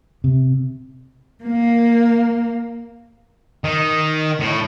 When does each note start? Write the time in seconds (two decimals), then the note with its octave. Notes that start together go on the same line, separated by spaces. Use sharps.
0.24 C3
1.44 A#3
3.64 D#3
4.40 A2